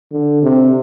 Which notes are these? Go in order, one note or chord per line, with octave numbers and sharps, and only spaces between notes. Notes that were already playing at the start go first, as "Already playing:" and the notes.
D3
C3